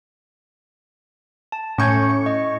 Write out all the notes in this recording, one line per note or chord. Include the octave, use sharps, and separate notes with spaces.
A5
A2 C#4 C#6 G6 G#6
D#5